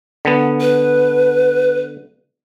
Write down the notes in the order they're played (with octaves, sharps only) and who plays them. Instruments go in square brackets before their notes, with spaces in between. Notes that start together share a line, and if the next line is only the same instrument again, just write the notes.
[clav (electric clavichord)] D3 B3
[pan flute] B4